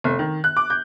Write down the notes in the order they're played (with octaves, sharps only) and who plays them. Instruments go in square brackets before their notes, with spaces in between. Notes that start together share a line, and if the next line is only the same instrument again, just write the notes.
[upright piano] F1
D#3
F#6
D6
G6